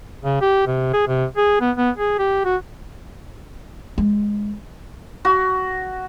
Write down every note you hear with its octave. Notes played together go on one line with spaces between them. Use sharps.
C#3
G4
C3
G#4
C3
G#4
B3
B3
G#4
G4
F#4
G#3
F#4